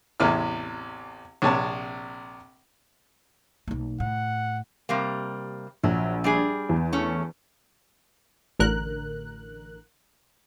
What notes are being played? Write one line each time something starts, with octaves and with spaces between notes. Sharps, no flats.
A1 E2 C3 E4 F6
A#1 C3 C#5 A5
B1 A#3
A2 F#5
C3 G3 A#3
A#1 F#3
G3 D4 G#4
E2
A3 C#4
A1 D3 A#4 F#6